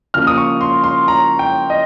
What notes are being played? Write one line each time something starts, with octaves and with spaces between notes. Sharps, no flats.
C#3 F3 A#3 F6
D#6
C#6
C6
C6
A#5
G5
D#5